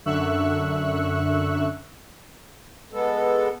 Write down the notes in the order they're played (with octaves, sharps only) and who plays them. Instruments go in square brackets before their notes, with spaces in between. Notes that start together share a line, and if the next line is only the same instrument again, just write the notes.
[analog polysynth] F#2 D3 E5 C#6 E6 F#6
[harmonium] G#3 B3 A4